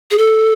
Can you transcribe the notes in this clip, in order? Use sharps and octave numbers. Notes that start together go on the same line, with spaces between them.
G#4
A4